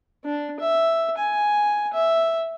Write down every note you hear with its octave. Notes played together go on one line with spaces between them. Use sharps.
D4
E5
G#5
E5